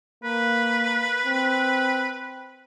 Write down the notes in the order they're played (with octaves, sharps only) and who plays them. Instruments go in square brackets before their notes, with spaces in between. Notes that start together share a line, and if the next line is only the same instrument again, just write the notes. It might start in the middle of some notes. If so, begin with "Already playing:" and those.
[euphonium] A#3 [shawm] B4
[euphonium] C4